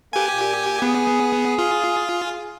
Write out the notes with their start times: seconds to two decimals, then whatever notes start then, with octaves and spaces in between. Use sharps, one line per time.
0.13 A#3 G4 A4 B4 G#5
0.34 A#2
0.82 B3 G#4
1.58 F4